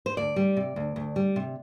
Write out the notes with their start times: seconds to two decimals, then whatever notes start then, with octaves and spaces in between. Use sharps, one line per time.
0.06 C5
0.17 D2 D5
0.36 G3
0.57 C3
0.76 D2
0.96 D2
1.16 G3
1.36 C3